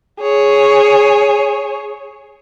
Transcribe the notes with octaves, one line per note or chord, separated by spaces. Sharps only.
G#4 C#5